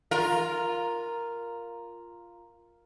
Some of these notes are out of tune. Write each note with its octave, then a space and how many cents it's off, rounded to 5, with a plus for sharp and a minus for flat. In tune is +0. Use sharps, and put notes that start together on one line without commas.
F4 +0 A#4 +0